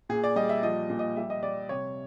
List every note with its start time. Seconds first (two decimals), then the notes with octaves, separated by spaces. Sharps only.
0.09 A#2 G#4
0.24 D5
0.36 G3 D#5
0.49 E5
0.62 F3 D#5
0.90 A#2
0.99 D#5
1.16 G3 E5
1.30 D#5
1.43 G3 D5
1.69 C3 C#5